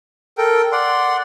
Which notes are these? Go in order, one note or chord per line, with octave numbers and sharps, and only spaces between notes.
A4 A#4 G5
D5 F#5 C6